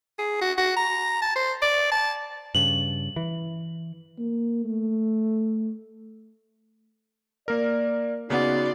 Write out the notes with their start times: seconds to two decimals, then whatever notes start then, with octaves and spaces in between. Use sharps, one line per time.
0.19 G#4
0.41 F#4
0.57 F#4
0.77 A#5
1.22 A5
1.36 C5
1.62 D5
1.92 A5
2.55 G2 C#3 F#7
3.16 E3
4.18 A#3
4.65 A3
7.48 A#3 A#4 D5
8.30 C#3 B3 D#4 F#4 D5 F#5 C6